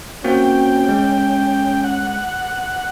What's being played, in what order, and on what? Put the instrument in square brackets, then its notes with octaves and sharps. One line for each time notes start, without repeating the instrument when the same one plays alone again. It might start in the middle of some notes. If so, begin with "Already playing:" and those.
[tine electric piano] A#3 C4 F#4 [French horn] C#4 [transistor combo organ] G5
[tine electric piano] G#3
[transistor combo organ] F#5